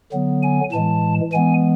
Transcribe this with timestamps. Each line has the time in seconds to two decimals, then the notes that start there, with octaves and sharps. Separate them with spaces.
0.12 D3 F#3 B3
0.42 G#5
0.72 A2 E3 G#3 A5
1.32 E3 G#3 B3 G#5